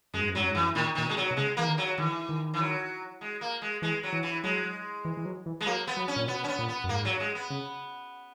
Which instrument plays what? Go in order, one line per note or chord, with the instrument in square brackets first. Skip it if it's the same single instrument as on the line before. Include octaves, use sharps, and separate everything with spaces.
[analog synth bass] F#2 [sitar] G#3
[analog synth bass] G#2
F#2
[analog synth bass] G#2 [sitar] F#3
[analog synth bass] F#2
G#2
[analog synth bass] F#2 [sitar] E3
[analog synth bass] A#2 [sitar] D#3
[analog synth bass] A#2 [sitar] D#3
[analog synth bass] B2 [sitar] G#3
[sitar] F#3
[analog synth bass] B2
[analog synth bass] C#3 [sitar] G#3
[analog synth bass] E3 [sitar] A#3
[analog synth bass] D#3
[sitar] F#3
[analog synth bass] D#3 [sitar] E3
[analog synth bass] D#3
[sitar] E3
F#3
G#3
A#3
G#3
[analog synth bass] E3 [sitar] G#3
[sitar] F#3
[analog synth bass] E3
[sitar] E3
[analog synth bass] F#3 [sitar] G#3
[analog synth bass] E3
E3
F#3
E3
[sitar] G#3
[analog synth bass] F#3 [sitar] A#3
[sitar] B3
[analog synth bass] F#3
[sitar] C#4
[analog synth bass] A#2
[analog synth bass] B2 [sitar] B3
[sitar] C#4
B3
[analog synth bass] A#2
[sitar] B3
[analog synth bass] F#2
[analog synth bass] G#2 [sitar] A#3
[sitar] F#3
G#3
B3
[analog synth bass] C#3